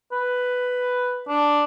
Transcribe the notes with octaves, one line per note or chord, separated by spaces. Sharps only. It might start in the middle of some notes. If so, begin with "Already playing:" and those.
B4
D4